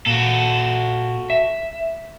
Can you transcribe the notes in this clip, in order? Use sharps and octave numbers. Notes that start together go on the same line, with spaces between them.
A#2 F#4 A4
E5